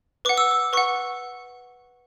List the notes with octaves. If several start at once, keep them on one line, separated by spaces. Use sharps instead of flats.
B4 F#5 D6
E6
D6
B4 F#5 C#6